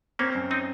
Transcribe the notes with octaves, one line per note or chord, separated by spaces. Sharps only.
A#3 C4 C#4
F#2
C4 D#4